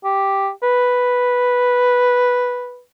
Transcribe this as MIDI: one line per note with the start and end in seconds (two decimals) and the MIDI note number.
0.05 0.50 67
0.63 2.81 71